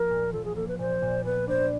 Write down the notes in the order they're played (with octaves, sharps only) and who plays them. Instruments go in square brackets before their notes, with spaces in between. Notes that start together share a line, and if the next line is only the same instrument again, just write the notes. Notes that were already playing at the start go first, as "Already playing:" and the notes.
Already playing: [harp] F3 A#3 [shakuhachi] A#4
[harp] A#2
[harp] F3 [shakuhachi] A4
[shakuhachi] G#4
[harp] A#3 [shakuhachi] A4
[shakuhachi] B4
[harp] A#2 [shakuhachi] C5
[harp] A#2
[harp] B3 [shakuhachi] B4
[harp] D4 [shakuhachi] C5